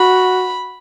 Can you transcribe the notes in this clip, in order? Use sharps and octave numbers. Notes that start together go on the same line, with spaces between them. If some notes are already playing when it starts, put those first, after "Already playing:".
Already playing: F#4 B5